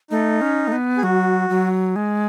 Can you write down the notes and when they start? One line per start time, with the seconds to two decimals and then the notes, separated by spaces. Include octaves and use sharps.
0.11 A3 D#4
0.41 C#4
0.68 A3
0.72 B3
0.97 G#4
1.03 F#3 F#4
1.49 F#3
1.96 G#3